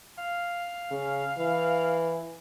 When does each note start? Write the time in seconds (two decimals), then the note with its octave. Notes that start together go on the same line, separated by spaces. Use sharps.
0.18 F5
0.91 C#3
1.38 E3